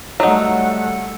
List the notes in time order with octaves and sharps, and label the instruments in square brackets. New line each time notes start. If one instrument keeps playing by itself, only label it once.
[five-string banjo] F#3 D#4 [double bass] G3 A3 [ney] F#5